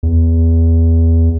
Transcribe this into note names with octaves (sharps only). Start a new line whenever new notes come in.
E2